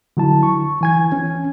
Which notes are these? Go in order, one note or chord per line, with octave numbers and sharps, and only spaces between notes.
D3 F#3 E4 A5
C#6
E3 G#5 G#6
C#4